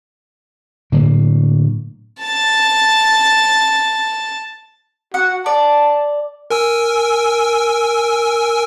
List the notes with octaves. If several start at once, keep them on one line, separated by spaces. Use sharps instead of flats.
A2 D3 F#3 A#3
A5 A6
F#4 F#5
D5 A5
A#4 G#5 E6